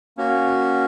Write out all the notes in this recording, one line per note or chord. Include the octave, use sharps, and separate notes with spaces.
A#3 C#4 F#4